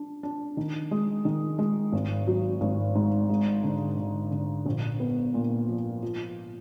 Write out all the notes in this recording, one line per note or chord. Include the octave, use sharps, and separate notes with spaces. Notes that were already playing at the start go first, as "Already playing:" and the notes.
Already playing: D4
D4
D#3
G#3
D#3
G#3
G#1
F#3
G#1
G#2
G#3
D3
D3
D3
A#1
B3
A#2
F3
F3